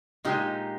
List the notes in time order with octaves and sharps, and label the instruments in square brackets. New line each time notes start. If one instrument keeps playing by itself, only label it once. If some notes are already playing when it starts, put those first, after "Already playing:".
[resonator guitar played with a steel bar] A#2 G#3 D#4 G4